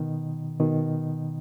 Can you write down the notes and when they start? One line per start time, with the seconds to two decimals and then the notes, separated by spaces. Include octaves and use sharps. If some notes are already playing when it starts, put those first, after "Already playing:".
Already playing: B2 D#3
0.59 B2 D#3